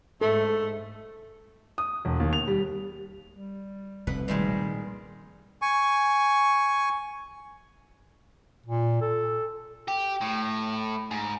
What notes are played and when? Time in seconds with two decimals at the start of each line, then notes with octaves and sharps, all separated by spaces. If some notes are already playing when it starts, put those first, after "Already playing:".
0.21 G#2 A3 A4
1.78 D#6
2.05 E1
2.20 D#2
2.33 F7
2.48 G3
3.32 G3
4.07 F1 C2 B2 B4
4.28 A#2 D#3 G3 G#3
5.62 G#5 C#6
8.66 A#2
9.01 A4
9.88 G4
10.21 A2
11.11 G#2